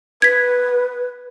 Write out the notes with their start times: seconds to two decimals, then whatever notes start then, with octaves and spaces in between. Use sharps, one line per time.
0.22 B4 G#6 B6